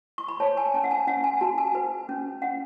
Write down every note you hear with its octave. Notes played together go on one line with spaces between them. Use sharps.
C#6
B5
C#5 A5
G#5
C#4 A5
F#5
G#5
C#4 F#5
G#5
F#4 A5
G#5
B4
C#4
C#4 F#5